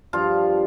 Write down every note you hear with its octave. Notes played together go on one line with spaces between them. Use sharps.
G2 F3 F4